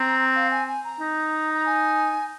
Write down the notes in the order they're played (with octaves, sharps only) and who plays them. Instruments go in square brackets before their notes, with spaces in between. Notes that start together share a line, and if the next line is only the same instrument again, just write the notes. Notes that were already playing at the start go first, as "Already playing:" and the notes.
Already playing: [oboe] C4 [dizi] A#5
[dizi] F5
G#5
G#5
A#5
[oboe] D#4
[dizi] A#5
G#5